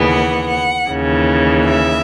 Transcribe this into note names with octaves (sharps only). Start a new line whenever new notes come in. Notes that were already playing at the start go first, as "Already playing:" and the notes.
Already playing: D#2 C#3 E3 B3
F#5
F#5
D#2 C#3 E3
E5